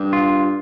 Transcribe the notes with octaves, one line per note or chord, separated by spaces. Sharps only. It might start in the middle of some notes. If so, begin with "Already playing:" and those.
Already playing: G2
F4